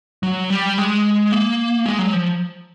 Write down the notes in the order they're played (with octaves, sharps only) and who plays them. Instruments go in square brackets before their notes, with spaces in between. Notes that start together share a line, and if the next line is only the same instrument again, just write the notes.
[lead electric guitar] F#3
G3
G#3
A#3
G#3
F#3
F3